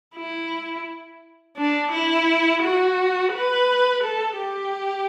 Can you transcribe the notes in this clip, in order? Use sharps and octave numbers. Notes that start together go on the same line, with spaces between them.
E4
D4
E4
F#4
B4
A4
G4